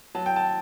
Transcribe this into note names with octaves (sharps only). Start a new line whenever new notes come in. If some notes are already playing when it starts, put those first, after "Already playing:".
F#3 A5
G5
A5